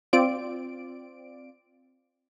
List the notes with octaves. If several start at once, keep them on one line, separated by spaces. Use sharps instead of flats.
C4 F4 D5 D7